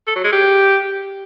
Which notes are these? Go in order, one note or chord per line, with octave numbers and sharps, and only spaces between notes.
A4
F#3
G#3
G4